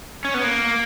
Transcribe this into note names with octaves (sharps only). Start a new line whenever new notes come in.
C#4
B3
A#3